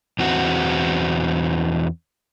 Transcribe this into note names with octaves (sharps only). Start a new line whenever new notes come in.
E2 C4 F#4